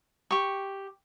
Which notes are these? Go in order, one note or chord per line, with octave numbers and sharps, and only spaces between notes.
G4 C#6